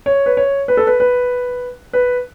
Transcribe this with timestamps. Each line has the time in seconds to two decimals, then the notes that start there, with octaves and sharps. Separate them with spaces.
0.06 C#5
0.26 B4
0.37 C#5
0.68 B4
0.77 A4
0.87 B4
1.00 B4
1.93 B4